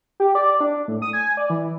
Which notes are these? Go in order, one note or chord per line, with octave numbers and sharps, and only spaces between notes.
G4
D5
D4
A2
D#6
G#5
D5
E3